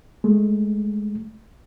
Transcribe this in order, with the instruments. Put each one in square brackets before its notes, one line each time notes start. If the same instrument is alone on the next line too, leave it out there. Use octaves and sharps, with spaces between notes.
[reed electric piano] G#3 A3